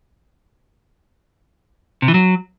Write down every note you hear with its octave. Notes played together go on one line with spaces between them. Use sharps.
C3
E3
F#3